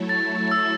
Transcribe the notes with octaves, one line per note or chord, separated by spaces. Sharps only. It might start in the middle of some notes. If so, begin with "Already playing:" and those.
Already playing: F#3 A3 E4 A4 C#5
A6
E6